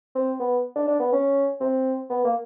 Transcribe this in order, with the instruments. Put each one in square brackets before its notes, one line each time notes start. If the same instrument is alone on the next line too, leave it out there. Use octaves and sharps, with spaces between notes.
[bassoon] C4
B3
D4
D4
B3
C#4
C4
B3
A#3